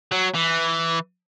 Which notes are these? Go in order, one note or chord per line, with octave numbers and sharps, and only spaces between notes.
F#3
E3